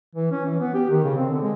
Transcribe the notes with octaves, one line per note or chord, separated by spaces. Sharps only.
E3
C#4
E3
B3
G4
D#3
C#3
C4
D3
G#3